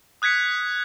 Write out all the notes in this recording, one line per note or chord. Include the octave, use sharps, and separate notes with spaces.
D#6 F#6 G#6 B6 C#7